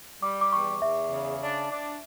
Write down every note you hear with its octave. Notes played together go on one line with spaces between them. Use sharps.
G3 D6
D6
E2 C#6
E2 E5
C#3
D4
D4